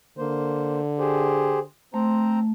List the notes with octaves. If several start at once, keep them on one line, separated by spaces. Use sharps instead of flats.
D3 A#3 C5
G4 G#4 C5
A3 C4 C5 A#5